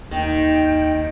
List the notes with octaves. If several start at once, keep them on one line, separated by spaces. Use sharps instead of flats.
D#2 D#3 D#4 G5